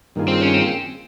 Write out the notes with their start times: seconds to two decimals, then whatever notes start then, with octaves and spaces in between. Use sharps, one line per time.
0.15 G2 D#3 A#3 F4 G#4
0.28 C4
0.41 C#4
0.54 C4